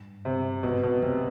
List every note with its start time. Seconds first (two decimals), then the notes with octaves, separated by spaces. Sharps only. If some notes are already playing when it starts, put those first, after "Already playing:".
Already playing: G2
0.25 C3
0.63 G#2 B2
0.83 B2
1.02 F#2 C3